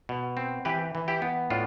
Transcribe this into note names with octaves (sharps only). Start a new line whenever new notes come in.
B2
C4
E3 G4 B4
E3
E4 G4
B3
A2 D4 F4